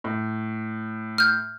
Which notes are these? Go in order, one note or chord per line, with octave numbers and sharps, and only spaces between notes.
A2
F6 G6